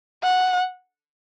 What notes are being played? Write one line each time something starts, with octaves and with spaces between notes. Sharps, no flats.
F#5